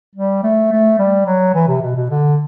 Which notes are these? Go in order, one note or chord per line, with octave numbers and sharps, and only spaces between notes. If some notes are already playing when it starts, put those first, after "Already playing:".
G3
A3
A3
G3
F#3
E3
C3
B2
B2
D3